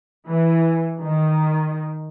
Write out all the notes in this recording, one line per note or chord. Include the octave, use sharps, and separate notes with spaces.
E3
D#3